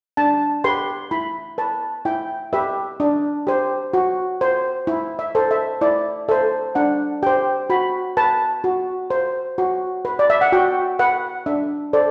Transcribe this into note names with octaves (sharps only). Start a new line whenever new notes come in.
D4 A5
G4 B4 C6
E4 B5
B4 A5
E4 G5
G4 B4 E5
D4
G4 C5
F#4
C5
E4
E5
A4 C5
E5
E4 D5
A4 C5 E5
D4 F#5
G4 C5 G5
F#4 B5
B4 A5
F#4
C5
F#4
B4
D5
E5
F#5
F#4 G5
B4 F#5
D4 E5
A4 C5 D5